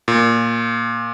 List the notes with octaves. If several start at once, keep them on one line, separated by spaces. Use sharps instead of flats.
A#2